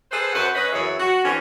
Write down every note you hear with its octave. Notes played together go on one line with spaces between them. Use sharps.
G#4 A4 B4 C5
F#2 B4 C5 F#5
C#4 B4 D#5
F#2 C#3 E3 G#4 C#5 E5
F#4
D3 E3 C4 C#4